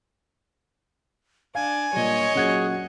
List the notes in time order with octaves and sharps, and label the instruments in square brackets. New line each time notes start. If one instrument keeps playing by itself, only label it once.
[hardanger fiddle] D4 [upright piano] F5 [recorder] G#5
[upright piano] A#2 G3 [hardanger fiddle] C#5 D#5
[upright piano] A#2 F#3 [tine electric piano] C#4 F#5 G#6 [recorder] G#4